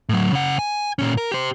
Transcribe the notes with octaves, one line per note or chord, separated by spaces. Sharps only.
A2 F#3
C#3 F#5
G#5
A#2 C#4
A#4
G4 C5